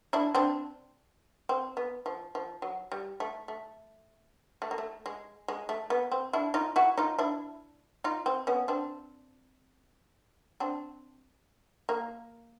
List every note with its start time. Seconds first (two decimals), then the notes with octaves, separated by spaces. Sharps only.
0.13 D4 E4
0.35 C4 D4
1.49 C4
1.77 B3
2.06 F3
2.35 F3
2.62 F#3
2.92 G3
3.20 A3
3.48 A3
4.62 A3
4.71 A#3
4.78 A3
5.06 G#3
5.48 G#3
5.69 A3
5.90 B3
6.12 C4
6.33 D4 E4
6.54 D#4 F4
6.76 E4 F#4
6.98 D#4 F4
7.19 D4 E4
8.04 D#4 F4
8.26 C4
8.47 B3 C#4
8.68 C4 D4
10.60 C4 D4
11.89 A#3